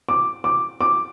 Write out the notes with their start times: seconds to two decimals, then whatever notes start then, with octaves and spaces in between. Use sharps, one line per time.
0.09 D6
0.44 D6
0.81 D6